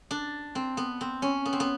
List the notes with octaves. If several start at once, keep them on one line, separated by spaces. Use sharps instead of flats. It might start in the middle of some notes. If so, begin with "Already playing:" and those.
D4
C4
B3
C4
C#4
B3
C4
B3